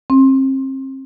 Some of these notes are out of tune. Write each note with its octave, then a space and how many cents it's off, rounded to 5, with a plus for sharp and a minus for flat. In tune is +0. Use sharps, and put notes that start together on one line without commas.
C4 +35